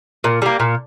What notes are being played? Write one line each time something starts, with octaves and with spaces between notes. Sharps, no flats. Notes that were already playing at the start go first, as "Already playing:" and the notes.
A#2
G3 A#3
A#2